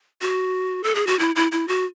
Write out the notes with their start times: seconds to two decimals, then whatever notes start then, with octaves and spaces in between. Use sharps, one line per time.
0.22 F#4
0.84 A4
0.95 G#4
1.07 F#4
1.19 E4
1.36 E4
1.52 E4
1.68 F#4